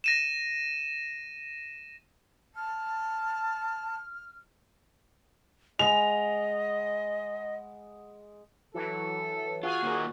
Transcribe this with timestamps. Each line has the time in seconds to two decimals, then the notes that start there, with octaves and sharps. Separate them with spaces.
0.04 A#6 D#7 E7
2.55 A5 F6
5.79 G#3 D#5 F#5 B5 F7
8.74 E3 F#3 A4
9.63 F4 F#4 G#4 F5 G#5
9.83 A#2 D#3 A#4